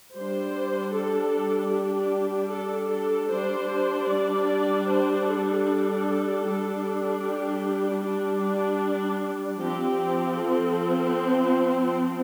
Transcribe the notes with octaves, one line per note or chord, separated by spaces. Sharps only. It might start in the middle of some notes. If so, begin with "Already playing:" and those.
G3 D4 C5
A4
G4
A4
A4
G3 D4 C5
D5
C5
A4
G3 D4
G4
D4
F3 C4 G4
A4
C5